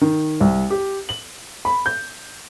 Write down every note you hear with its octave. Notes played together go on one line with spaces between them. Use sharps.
D#3
C2
G4
F#7
B5
G6